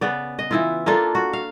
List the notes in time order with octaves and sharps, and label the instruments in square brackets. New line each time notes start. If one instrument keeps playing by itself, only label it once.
[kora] C#3 B3 D5
D#5
E3 E4 F4
A#3 D4 F4 A4
F#4
F5